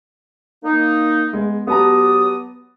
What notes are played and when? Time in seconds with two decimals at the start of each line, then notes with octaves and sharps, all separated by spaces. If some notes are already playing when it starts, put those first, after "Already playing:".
0.64 A#3 D#4
1.33 G#3 B3
1.67 F#3 B3 G4 A5 A#5 D#6